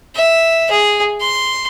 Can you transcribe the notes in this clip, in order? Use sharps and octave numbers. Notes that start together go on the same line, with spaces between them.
E5
G#4
C6